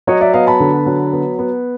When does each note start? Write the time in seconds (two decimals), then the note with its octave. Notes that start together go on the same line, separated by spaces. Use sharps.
0.07 F#3 C#5 D#5
0.21 D5 E5
0.34 B3 D#5 F5
0.47 A5 B5
0.60 D3
0.86 F#3
1.13 B3
1.39 B3